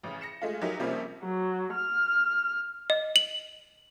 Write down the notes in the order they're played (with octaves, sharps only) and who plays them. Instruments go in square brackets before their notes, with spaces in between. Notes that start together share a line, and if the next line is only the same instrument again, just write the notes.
[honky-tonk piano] A1 C#3
A#6 C#7 E7
G#3 A3 F4
F#3 D#4 E4 G4 A#4
C3 F3 G3 A#3 C4 C#4
[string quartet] F#3
F6
[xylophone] D#5
F#7